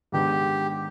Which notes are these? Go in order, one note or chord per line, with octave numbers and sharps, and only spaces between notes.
G#2 D#3 G#3 B3 D4 G4